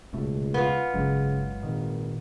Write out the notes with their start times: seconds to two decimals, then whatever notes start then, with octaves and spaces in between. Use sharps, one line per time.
0.13 D#1 C#2 B2 A3
0.54 B3 F4
0.94 G1 C#3 F#3 G#3
1.63 G#1 A#2 D#3